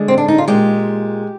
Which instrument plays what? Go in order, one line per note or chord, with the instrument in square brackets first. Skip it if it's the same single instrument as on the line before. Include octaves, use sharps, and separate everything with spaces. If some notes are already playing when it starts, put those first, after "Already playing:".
Already playing: [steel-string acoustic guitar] D3 G#3
C4
D4
D#4
F4
A#2 G#3 G4